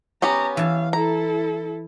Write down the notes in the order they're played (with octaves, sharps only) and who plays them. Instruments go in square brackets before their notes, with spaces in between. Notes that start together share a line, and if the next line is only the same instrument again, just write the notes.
[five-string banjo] B3 C#4 G4 [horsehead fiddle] A#5
[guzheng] E3 A5 [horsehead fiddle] F5
[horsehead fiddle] E4 A4 [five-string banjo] A#5